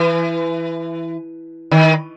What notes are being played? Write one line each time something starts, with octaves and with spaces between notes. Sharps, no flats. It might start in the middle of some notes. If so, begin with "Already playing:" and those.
Already playing: E3
D#3